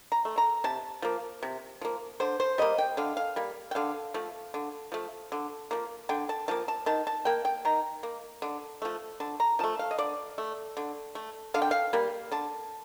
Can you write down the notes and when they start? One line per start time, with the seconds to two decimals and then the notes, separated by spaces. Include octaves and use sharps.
0.12 A#5
0.25 A3
0.38 A#5
0.64 C3 A5
1.02 F3 A#3
1.43 C3
1.81 F3 A#3
2.20 D3 C5
2.40 C5
2.58 G3 A#3 D#5
2.78 G5
2.97 D3 F5
3.17 F5
3.36 G3 A#3
3.71 G5
3.75 D3 F5
4.14 F3 A3
4.54 D3
4.92 F3 A3
5.32 D3
5.71 F3 A#3
6.09 D3 G5
6.29 A5
6.48 F3 A#3 A5
6.68 A5
6.86 D#3 A5
7.07 A5
7.25 A#3 G5
7.45 G5
7.65 D#3 A#5
8.03 A#3
8.42 D3
8.82 F3 A3
9.20 D3 A5
9.40 A#5
9.59 F3 A3 A5
9.79 F5
9.91 D#5
9.98 D3 D5
10.38 A3
10.77 D3
11.15 A3
11.54 D3 F5
11.62 G5
11.71 F5
11.93 G3 A#3
12.32 D3 A5